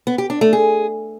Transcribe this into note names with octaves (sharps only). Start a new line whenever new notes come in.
B3
G4
D4
A3
G#4